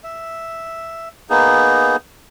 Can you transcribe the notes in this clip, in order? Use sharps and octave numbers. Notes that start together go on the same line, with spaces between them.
E5
A#3 B3 D#4 G#4